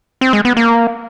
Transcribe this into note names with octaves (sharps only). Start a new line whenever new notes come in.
C4
G#3
B3
A#3